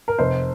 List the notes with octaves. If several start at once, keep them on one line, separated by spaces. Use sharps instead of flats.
A#4
F1 C5